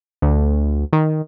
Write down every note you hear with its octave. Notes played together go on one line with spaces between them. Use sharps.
D2
D#3